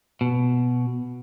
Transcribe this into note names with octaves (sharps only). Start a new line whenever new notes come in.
B2